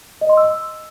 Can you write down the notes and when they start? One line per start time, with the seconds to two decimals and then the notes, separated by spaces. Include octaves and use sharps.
0.21 D#5
0.29 C6
0.37 E6